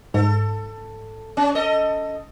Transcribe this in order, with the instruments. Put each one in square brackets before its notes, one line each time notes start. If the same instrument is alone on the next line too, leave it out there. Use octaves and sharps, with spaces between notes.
[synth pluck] G#2 [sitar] A4
[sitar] C#4
A4 D#5